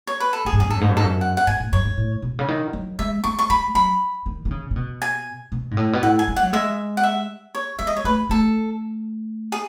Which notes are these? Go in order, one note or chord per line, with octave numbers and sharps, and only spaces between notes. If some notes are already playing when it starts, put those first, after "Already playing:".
C#5
B4
A4
F#2 G#4
G#2
F#2 G#4
G#2
A4
F#2
G#2
F#2
G#2 A4
F#2
F#5
F#5
G#2 G#5
A2
F#2 C#5
G#2
A2
B2
C#3
D#3
F#3
G#3 E5
A3 C#6
C#6
G#3 B5
F#3 B5
D#3
D#3
C#3
C#3
B2
G#5
B2
G#2
A2
B2
A2 F#5
G#5
G#3
F#5
F#3
G#3 E5
F#5
E5
C#5
G#3 E5
D#5
C#5
A3 B4
A3 A4
G#4